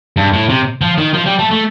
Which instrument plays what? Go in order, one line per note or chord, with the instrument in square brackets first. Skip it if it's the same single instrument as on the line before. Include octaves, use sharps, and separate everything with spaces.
[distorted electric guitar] G2
A2
C3
F3
D#3
F3
G3
A3
A3